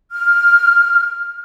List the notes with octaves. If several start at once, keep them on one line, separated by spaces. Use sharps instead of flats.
F6